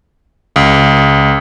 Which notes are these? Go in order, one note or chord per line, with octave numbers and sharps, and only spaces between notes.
C#2